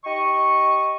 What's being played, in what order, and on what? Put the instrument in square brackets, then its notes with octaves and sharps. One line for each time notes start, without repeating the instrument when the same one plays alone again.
[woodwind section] D#4 G4 D#5 C#6